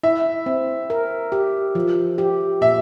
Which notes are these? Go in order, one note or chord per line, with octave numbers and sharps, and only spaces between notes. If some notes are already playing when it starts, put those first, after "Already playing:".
E4 E5
C4
A#4
G4
F3
G4
A#2 E5